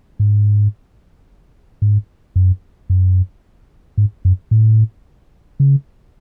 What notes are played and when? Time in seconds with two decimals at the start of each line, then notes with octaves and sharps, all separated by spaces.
0.20 G#2
1.82 G#2
2.36 F#2
2.90 F#2
3.98 G#2
4.25 F#2
4.51 A2
5.60 C#3